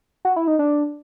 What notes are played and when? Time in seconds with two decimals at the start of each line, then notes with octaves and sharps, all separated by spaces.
0.25 F#4
0.36 E4
0.47 D#4
0.59 D4